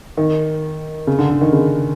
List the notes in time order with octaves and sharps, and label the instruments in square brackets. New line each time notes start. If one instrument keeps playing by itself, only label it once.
[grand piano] D#3
C#3
D3
D3
D#3
C#3